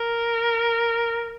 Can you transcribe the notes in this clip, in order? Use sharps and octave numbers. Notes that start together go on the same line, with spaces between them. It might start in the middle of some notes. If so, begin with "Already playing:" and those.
Already playing: A#4